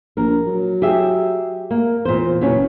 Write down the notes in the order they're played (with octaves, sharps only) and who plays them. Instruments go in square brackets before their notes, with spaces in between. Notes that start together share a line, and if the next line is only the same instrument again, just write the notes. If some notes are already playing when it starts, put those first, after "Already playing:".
[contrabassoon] A#1 [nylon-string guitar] A#4
[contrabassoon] F#3
[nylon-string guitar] G4 G#4 E5
A#3
[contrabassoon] E2 [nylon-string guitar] A#2 C5
[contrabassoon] F#1 [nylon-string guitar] E2 B2 C#4